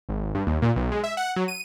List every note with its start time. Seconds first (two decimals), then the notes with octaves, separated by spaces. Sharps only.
0.09 G#1
0.35 G2
0.47 D#2
0.62 A#2
0.76 B1
0.92 G#3
1.04 E5
1.17 F#5
1.36 F#3
1.48 D#7